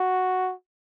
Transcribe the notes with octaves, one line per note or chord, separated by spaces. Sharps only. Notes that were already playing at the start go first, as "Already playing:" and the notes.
Already playing: F#4